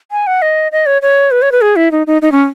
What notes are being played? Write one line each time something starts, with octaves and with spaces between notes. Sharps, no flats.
G#5
F#5
D#5
D#5
C#5
C#5
B4
C#5
B4
G#4
E4
D#4
D#4
D#4
C#4